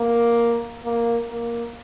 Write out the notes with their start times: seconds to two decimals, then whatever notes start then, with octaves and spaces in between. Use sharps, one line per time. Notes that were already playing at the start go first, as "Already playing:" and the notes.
Already playing: A#3
0.85 A#3
1.31 A#3